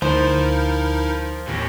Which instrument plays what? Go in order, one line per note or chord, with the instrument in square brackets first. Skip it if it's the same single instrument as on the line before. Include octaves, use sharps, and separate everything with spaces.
[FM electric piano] D2 [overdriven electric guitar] F3 [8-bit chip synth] D#4 E4 A#4 [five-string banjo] C5
[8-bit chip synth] D#2 A2 D#3 [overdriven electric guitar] C3 C#4